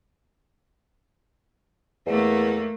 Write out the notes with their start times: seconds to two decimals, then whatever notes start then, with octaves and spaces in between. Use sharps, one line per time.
2.07 E2 A3 A#3